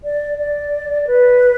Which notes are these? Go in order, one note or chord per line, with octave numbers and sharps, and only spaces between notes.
D5
D5
B4